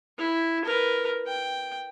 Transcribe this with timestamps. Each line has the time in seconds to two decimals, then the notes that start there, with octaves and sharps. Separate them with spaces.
0.18 E4
0.64 A#4 B4
1.27 G5